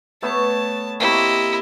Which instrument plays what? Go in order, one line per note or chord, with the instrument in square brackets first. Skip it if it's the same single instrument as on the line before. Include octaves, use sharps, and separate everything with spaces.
[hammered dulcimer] A3 B3 C#5 [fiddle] A5
[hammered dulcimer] C3 A#3 C#6 [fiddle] E4 D#5